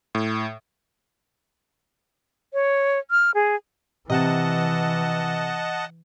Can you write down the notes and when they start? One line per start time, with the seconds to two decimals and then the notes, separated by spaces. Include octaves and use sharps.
0.15 A2
2.53 C#5
3.11 F6
3.35 G#4
4.10 C3 E3 D#5 F#5 A5